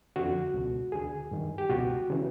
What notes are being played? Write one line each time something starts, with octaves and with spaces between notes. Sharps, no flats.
F2 D3 F#4
C#2 B2
D2 D3 G#4
G2 D#3
G4
C#2 B2 F#4
C#3 E3